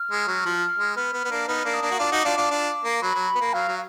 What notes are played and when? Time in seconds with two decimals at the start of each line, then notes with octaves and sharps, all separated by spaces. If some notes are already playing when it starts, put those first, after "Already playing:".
Already playing: F6
0.11 G#3
0.28 F#3
0.46 F3
0.79 G#3
0.96 B3 F6
1.13 B3
1.25 B3
1.31 A#3 D4
1.48 B3 D#4 F6
1.65 A#3 D4
1.74 D#6
1.82 A#3 D4
1.91 F#4
1.99 D4 F4 D6
2.12 D#4 F#4
2.25 D4 F4
2.37 D4 F4
2.51 D4 F4
2.85 A#3
3.02 F#3 B5
3.15 F#3
3.35 B3
3.41 A#3
3.53 F#3 F5
3.68 F#3